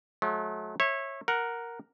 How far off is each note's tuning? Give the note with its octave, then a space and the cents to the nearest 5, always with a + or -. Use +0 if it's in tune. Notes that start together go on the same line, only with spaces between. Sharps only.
F#3 -30 A3 -40
C#5 -25 E5 +0
A#4 +0 F#5 +0